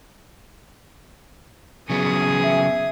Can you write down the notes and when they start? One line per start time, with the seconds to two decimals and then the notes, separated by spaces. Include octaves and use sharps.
1.90 C#3 F#3 B3 G#4 D#6
2.43 E5